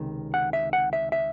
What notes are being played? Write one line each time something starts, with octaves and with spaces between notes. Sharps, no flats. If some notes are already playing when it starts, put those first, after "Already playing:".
Already playing: C#2 C3 D#3
F#5
E5
F#5
E5
E5